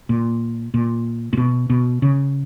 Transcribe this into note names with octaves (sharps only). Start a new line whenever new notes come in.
A#2
A#2
A#2
B2
B2
C#3